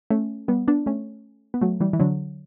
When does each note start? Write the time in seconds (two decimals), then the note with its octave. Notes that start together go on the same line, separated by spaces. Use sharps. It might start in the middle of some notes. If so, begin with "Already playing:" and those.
0.10 A3 C#4
0.48 G3 B3
0.67 B3 D4
0.86 A3 C#4
1.54 B3
1.61 F#3 A3
1.80 E3 G3
1.93 E3
1.99 D3 F#3